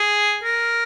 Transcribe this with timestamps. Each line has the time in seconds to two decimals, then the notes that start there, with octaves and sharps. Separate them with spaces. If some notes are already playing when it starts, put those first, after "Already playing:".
Already playing: G#4
0.44 A#4